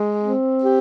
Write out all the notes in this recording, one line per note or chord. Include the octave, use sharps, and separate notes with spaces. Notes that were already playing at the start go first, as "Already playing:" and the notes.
Already playing: G#3
C4
G4